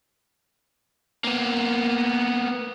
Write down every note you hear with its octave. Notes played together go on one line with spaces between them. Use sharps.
A#3 B3